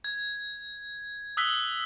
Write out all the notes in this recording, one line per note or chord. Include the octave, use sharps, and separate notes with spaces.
G#6
D#6 E6 F#6 B6 G7